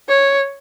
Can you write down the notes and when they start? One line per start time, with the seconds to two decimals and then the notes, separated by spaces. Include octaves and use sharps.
0.09 C#5